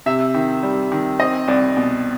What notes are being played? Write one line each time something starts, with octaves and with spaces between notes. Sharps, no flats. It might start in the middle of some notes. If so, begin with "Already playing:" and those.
C3 E5
D#3
G3
D#3
C4 D#5
C2 D5
B2